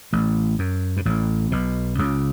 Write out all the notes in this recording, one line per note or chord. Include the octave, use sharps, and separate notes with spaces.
A1 A2
F#2
G2
A1 A2
B1 B2
C#2 C#3